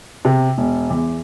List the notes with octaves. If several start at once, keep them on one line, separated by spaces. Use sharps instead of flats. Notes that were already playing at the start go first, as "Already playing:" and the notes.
C3
E1
E2